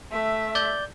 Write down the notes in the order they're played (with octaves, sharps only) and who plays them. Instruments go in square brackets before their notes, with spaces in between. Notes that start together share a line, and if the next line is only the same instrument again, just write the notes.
[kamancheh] A3 E5
[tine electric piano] D5 G6